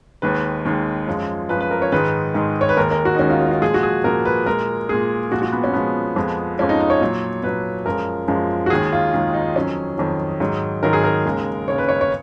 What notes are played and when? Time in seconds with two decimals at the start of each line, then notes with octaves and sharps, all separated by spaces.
0.22 D#2 D#3 G#3 B4
0.65 D#2 D#3 G#3
1.07 F#2 F3 G#3
1.49 F#2 F3 G#3 B4
1.61 B4
1.71 A#4
1.82 C#5
1.92 G#2 D#3 G#3 B4
2.34 G#2 D#3 G#3
2.61 C#5
2.69 B4
2.77 D#2 D#3 G#3 A#4
2.91 A#4
3.05 F#4
3.15 D#4
3.19 D#2 D#3 G#3 C#4
3.30 F4
3.40 F#4
3.46 D#4
3.51 F4
3.61 A#2 F3 G#3 G#4
3.74 F#4
3.83 G#4
4.04 A#2 F3 G#3 A#4
4.25 B4
4.46 A#2 G#3 A#4
4.89 A#2 G#3 G#4
5.31 A#2 F3 G#3 F#4
5.42 F#4
5.53 B3
5.64 C#4
5.73 A#2 F3 G#3 B3
6.16 F2 F3 G#3
6.58 F2 F3 G#3 C#4
6.69 D#4
6.80 D#4
6.90 C#5
7.01 A#2 F#3
7.43 A#2 F#3 B4
7.85 F#2 F3 G#3 A#4
8.28 F#2 F3 G#3
8.66 F#4
8.70 D#2 D#3 G#3 G#4
8.93 F4
9.13 D#2 D#3 G#3
9.34 D#4
9.55 F2 D#3 F#3 C#4
9.98 F2 D#3 F#3
10.40 G#2 D#3 F#3
10.83 G#2 D#3 F#3 A#4
10.93 G#4
11.04 A#4
11.25 D#2 C#3 G#3
11.68 D#2 C#3 G#3 C#5
11.78 B4
11.89 C#5
12.01 C#5